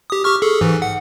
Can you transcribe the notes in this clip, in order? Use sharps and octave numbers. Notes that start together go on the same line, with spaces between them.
G4 D#6
G4 C#6 F6
G#4 A4
G#2 E3
F#5